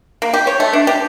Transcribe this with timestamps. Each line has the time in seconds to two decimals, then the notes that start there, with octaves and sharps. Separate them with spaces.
0.22 A#3
0.33 G4
0.47 C#5
0.60 A3
0.73 D4
0.87 G4